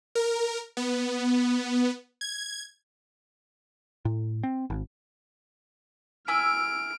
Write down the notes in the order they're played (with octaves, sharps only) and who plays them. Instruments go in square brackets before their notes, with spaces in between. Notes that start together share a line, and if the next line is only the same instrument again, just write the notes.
[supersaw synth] A#4
B3
G#6
[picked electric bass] A2
C4
G#1
[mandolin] E4 G#5 E6 [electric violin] F6 D7